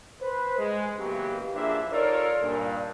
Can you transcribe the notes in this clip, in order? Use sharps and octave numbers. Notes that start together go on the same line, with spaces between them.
B4 C5
G#3
C#3 E3 F#3 A#3 B3 G4
F3 A#3 D4 E4 G#4 E5
D#4 F4 A4 A#4 C#5 D5
G2 A#2